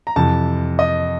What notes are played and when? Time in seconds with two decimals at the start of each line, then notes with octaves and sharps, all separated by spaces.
0.07 A#5
0.16 F2 C3 E3 A5
0.79 D#5